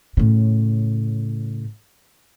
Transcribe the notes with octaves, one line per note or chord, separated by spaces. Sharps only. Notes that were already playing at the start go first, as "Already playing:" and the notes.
A2 C#3